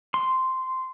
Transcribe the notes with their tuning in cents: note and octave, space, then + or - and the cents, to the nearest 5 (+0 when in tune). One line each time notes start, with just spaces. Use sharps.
C6 -10